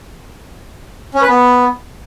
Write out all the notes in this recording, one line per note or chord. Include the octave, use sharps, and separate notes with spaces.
C#4
B4
B3